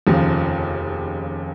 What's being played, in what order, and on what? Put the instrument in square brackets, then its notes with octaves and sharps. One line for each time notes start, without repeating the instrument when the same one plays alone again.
[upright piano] F1 D#2 C#3 F3